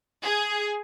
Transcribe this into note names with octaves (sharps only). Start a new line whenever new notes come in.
G#4